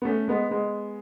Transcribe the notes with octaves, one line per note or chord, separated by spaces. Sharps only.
B3
A3 C#4
G#3 B3
G#3 B3